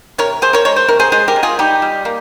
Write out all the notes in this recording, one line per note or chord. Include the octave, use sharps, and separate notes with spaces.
C3 A#4 C#5
C3 G#4 C5
A#4 C#5
G#3 C#5
C5
C3 A#4
G#4 C5
G#3 G#4 C5
G4 A#4
G#3
F4 G#4
G3 D#4 G4
G3
A#3